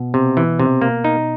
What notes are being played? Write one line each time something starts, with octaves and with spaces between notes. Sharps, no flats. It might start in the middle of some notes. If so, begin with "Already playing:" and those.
Already playing: B2
C3
E3
C3
A#3
D#4